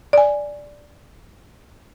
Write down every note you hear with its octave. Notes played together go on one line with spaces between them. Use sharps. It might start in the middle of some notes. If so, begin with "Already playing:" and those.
D5 G#5